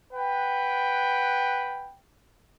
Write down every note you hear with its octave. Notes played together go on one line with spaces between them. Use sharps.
B4 F#5 G5